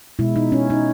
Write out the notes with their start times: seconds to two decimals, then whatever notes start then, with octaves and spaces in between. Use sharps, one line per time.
0.19 B2 G#3 E4
0.36 D#4
0.52 C#4
0.70 D#4